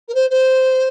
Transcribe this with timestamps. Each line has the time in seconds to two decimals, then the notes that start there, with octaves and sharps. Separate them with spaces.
0.08 A#4
0.14 C5
0.30 C5